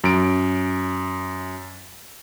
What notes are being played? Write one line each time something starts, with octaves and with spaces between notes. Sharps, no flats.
F#2 D7